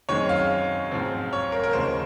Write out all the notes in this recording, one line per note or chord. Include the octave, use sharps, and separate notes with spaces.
F#2 D#3 G#3 C4 C#5
F5
G#2 F3 C4
C#5
A#4
A#4
D#2 C#3 F3 G#3 C5